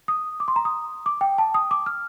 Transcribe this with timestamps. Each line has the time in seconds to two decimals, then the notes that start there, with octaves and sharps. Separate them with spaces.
0.08 D#6
0.40 D6
0.48 C6
0.56 A#5
0.65 D#6
1.06 D6
1.21 G5
1.38 A5
1.54 D#6
1.71 D6
1.86 F6